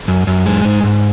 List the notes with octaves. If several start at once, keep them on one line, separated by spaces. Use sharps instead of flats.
F#2
F#2
G#3
G#2
G#2